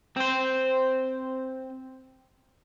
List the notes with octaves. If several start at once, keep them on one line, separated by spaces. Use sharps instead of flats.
C4 C5